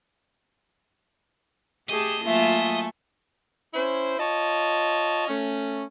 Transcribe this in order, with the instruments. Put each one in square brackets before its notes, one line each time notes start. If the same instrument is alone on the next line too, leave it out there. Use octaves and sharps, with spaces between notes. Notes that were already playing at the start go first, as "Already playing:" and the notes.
[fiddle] A3 A5 [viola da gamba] G4 G#4 [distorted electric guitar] D#5
[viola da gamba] F#3 A#3 F4 [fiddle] A3 G#5 [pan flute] E5
[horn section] C#4 E4 C5
F4 C#5 D#5 A5
A3 C#4